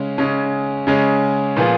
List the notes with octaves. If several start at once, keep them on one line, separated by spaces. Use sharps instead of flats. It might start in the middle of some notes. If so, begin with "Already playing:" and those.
Already playing: C#3 G#3 C#4
C#3 G#3 C#4
C#3 G#3 C#4
A#2 F3 B3 F4 G#4